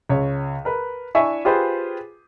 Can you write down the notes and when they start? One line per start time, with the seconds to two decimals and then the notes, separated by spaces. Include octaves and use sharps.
0.09 C#2 C#5
0.65 A#4 B4
1.15 D4 E4 E5 G#5 C#6
1.45 F4 G4 G#4 B4 C5